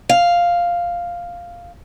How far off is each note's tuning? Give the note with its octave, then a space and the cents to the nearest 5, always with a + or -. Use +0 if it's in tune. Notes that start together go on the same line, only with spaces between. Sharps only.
F5 +0